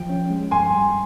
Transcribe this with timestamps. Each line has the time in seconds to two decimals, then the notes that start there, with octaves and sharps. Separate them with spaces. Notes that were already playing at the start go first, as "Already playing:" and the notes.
Already playing: F3 G5
0.10 C#4
0.30 G#3
0.51 G2 G#5 C6
0.73 G3